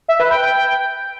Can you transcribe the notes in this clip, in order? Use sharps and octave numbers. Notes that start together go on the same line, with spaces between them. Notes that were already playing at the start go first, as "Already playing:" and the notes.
E5
B4
G5
G5